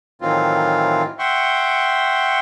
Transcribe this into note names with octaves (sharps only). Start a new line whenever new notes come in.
A2 D#3 E3 F#3 C4 F4
E5 F#5 G5 C6 C#6